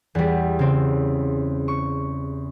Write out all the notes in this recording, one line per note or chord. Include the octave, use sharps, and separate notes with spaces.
E2 G3
C#3 C4
C#6